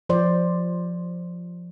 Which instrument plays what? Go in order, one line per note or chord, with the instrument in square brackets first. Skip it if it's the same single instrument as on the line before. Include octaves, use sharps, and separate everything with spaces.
[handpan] F3 C5 D5